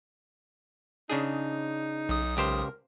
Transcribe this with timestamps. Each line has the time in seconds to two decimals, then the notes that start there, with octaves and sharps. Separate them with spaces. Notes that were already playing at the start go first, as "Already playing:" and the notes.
1.10 C#3 D4 D#4 G#4
2.09 B1 D#6
2.37 C#2 G4 A#4 C5